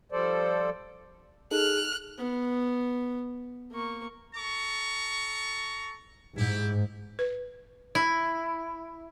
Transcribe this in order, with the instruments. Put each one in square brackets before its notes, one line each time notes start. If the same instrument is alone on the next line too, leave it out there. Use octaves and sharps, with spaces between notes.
[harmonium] F3 G3 A4 C5 D5
[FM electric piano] D#4 A4 [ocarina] G#4 [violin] F6 F#6
[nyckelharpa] B3
A#3 C#6
[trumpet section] A4 A#5 C#6
[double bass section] G#2 [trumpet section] E4 G4
[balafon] B4
[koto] E4